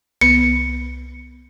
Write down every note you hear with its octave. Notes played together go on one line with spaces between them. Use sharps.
C2 B3 C#7